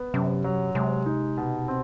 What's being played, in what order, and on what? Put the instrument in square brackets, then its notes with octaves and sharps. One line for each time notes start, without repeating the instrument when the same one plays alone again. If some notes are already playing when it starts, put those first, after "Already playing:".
Already playing: [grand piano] B3
[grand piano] F#2 [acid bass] C3
[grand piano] F#3
[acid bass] C3 [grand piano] G#3
[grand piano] D#4
B2
C4